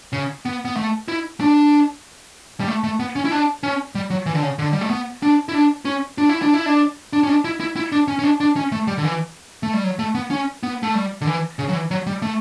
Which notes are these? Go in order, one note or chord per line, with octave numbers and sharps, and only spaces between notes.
C#3
B3
B3
A3
E4
D4
G3
A3
A3
B3
C#4
E4
D4
C#4
G3
F#3
E3
D3
C#3
D3
G3
A3
B3
D4
E4
D4
C#4
D4
E4
D4
E4
D4
D4
C#4
D4
E4
E4
E4
D4
C#4
C#4
D4
D4
C#4
A3
G3
D3
E3
A3
G3
F#3
A3
B3
C#4
B3
A3
G3
D3
E3
C#3
F#3
E3
F#3
G3
A3